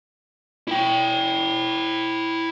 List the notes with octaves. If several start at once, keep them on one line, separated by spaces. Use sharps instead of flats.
E4 G5